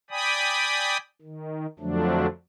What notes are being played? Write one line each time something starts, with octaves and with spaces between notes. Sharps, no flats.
D5 G5 G#5 B5 D#6
D#3
F2 D3 F3 F#3 A3 D4